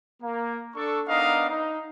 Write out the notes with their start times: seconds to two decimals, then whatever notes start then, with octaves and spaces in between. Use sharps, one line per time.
0.23 A#3
0.76 D4 A4 C#6
1.08 B3 D4 D#4 A#4 D#5 F5
1.49 D#4